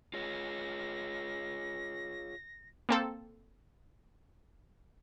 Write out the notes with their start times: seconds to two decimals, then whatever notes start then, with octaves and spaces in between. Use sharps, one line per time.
0.13 F4 G#4 C#5 A#6
2.89 A#3 C4 A4